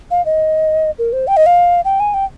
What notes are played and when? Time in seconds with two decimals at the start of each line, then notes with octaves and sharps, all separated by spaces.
0.11 F5
0.26 D#5
0.99 A#4
1.13 C5
1.27 G5
1.37 D#5
1.46 F5
1.85 G5
2.00 G#5
2.14 G5